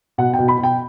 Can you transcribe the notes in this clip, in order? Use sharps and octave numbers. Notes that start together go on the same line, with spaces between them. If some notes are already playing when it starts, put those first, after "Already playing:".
B2 F#5
G5
B2
B5
B2
G5